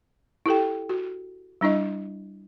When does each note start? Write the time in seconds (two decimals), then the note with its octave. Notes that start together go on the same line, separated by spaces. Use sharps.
0.46 E4 G4 A4 G5
0.89 F#4
1.61 G3 D4 E4 D#5